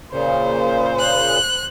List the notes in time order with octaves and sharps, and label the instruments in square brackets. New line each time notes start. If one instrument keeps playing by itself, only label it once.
[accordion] A#2 C#3 [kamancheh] C5
[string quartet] F#6